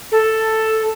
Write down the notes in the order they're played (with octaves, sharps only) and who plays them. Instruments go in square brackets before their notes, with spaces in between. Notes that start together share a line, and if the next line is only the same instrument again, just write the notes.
[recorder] A4